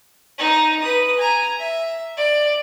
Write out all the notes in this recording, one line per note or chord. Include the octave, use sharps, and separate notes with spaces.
D#4
B4 D#6
G#5 A#5
E5
D5